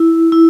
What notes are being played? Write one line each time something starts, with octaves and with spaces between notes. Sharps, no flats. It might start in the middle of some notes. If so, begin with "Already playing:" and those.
Already playing: E4
E4